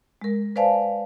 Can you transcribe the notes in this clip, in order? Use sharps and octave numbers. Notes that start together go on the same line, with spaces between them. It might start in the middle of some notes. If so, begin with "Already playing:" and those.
G#3 A#4
B4 C5 D5 F5 G#5 A5